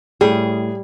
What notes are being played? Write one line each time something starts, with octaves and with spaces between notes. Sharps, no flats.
A2 G3 G#4